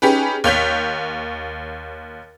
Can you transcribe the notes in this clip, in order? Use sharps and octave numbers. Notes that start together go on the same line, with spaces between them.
C#4 D#4 G4 G#4 B4
D#2 C#5 G6 B6